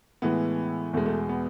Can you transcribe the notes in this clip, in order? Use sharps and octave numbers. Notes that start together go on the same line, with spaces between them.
A2 E3 G#3 B3
E2 B2 G#3 A3
A3
B3